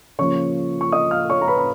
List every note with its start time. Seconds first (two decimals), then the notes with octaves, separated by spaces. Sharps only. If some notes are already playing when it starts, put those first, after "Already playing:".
0.19 C#3 F3 A#3 C#5 C#6
0.81 C#6
0.92 D#5 D#6
1.11 F5 F6
1.30 C#5 C#6
1.42 A#5
1.48 B4 B5
1.58 B5